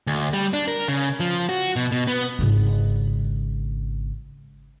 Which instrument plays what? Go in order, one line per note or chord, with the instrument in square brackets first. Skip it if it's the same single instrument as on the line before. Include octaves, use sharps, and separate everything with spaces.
[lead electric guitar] D2
G3
D4
A#4
C#3
F3
F#4
B2
B2
B3
[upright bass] G#1 C#3